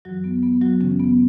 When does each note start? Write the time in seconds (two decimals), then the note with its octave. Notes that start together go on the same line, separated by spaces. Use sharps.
0.05 F#2 E3 F#3 F#4
0.24 B3
0.43 B3
0.62 F#3 F#4
0.80 F#2 C#3 E3 C#4
1.00 B3